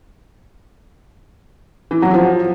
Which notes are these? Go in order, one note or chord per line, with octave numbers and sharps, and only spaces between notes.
E3
F#3
F3